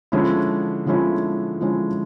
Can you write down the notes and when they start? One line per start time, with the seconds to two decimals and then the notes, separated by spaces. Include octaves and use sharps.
0.12 D3 F3 G#3 C#4 E4
0.86 D3 F3 G#3 C#4 E4
1.61 D3 F3 G#3 C#4 E4